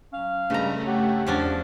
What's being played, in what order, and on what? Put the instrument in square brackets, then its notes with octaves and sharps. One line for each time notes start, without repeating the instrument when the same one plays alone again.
[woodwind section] F#3 C#4 F5
[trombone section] G2 G#3 [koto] C#3 A#5 [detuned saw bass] A3
[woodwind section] G2 C#5 F#5 [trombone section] G4
[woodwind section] E2 [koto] F3 C#4 D4